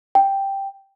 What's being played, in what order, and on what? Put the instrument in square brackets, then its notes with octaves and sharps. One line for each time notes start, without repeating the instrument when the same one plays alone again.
[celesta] G5